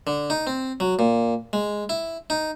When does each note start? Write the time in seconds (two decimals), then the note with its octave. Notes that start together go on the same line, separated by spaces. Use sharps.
0.07 D3
0.30 D#4
0.47 C4
0.80 F#3
0.99 A#2
1.53 G#3
1.89 E4
2.30 D#4